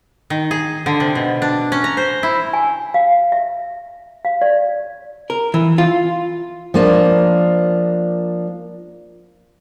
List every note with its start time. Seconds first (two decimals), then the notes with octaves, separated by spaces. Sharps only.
0.30 D#3
0.51 G#4
0.86 D3
1.00 C3
1.15 B2
1.42 D4
1.72 C#4
1.84 A#5
1.97 C5
2.23 E4
2.53 G#5
2.94 F5
3.32 E5
4.25 F5
4.42 D5
5.30 A#4
5.54 E3
5.78 F4
6.74 F3 A#3 D4